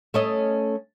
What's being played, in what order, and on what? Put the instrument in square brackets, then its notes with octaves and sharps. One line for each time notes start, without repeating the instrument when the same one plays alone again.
[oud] A3 C#4 D#5